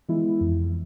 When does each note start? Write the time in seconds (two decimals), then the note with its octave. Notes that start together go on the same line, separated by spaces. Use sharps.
0.09 E3 G#3 B3 E4
0.41 F2